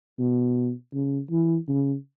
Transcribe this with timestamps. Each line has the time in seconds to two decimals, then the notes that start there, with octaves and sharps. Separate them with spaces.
0.19 B2
0.94 C#3
1.31 E3
1.68 C#3